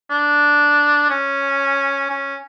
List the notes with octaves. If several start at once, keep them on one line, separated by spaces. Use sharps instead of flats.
D4
C#4
C#4